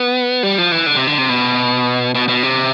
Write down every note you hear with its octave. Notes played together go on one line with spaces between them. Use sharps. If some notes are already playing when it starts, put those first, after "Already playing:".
Already playing: B3
G3
F3
E3
D3
C3
D3
C3
B2
B2
B2
C3